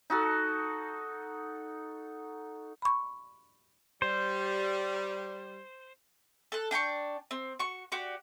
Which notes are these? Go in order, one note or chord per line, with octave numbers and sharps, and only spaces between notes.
D#4 F#4 A4
B5 C#6
G3 C5
A4 F#6
D4 G5 B5 C#6
C4
F#4 C#6
F#4 G4 D5